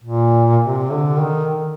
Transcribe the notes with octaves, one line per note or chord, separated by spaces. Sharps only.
A#2
C3
D3
D#3